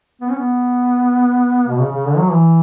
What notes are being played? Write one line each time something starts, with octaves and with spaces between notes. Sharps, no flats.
B3
C#4
B3
B2
C#3
C#3
D3
F#3
E3